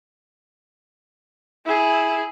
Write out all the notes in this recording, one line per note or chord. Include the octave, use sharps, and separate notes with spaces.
E4 G#4